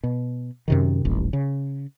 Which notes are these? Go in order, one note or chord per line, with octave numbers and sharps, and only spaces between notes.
B2
F#2 C3 D#3
D#1 A1
C#3